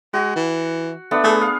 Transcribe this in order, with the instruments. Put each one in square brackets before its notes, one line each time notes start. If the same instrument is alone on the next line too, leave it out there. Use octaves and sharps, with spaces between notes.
[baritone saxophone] G#3 [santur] F#4
[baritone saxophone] E3
[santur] A3 B3 D4
[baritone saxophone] A3 [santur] G#4 B4
[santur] F5